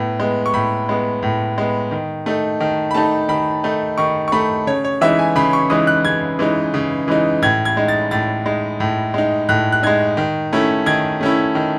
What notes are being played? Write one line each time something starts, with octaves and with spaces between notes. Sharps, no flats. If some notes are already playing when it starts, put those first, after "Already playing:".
Already playing: A2 B3
G#3 B3
C#6
A2 B5
G#3 B3
A2
G#3 B3
D#3
A3 D#4
D#3
B5
A3 D#4 A5
D#3 B5
A3 D#4
D#3 C#6
C#6
A3 D#4 B5
C#3 C#5
C#5
E3 G#3 D#4 E5
G#5
C#3 B5
C#6
E3 G#3 D#4 D#6
F#6
C#3 G#6
E3 G#3 D#4
C#3
E3 G#3 D#4
A2 G#6
G#6
G#3 D#4
A6
A2 A6
G#3 D#4
A2
G#3 D#4
A2 F#6
F#6
G#3 D#4 G#6
D#3
A3 C#4 E4
D#3 G#6
A3 C#4 E4
D#3